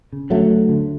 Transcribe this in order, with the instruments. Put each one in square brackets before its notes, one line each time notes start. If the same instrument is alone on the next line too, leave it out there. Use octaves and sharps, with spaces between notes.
[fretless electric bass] C#3
D2 F#3 A3
D2
D3